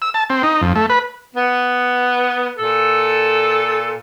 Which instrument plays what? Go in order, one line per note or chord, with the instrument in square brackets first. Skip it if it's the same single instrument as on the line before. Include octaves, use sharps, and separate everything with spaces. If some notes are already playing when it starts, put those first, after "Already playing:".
[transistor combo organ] E6
A5
C4
D#4
F2
A3
B4
[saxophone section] B3
A#2 A4